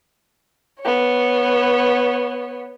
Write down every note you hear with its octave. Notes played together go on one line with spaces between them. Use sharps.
B3 C#5